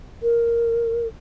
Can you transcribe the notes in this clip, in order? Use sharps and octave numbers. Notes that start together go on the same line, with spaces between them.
A#4